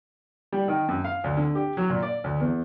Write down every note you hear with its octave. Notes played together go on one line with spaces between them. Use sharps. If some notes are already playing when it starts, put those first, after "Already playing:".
G3
D#3
F#2
F5
D2
D3
G4
F#3
A#2
D5
D2
E2